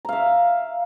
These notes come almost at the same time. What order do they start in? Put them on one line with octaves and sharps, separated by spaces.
A#5 F5 E5